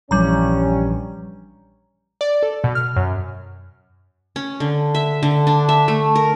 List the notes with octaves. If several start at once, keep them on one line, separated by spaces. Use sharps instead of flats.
A#1 G2 E3 F3 G3 C#4 A#5
D5
A4
B2
F6
F#2
C#4
D3
E5
D3
D4
E5
A3
A#4